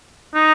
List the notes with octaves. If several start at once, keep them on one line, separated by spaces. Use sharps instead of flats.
D#4